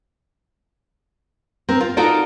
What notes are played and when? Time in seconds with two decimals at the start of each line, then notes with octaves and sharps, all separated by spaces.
1.69 C4 A#4
1.81 F4
1.97 D#4 F4 F#4 A4 A#4 D5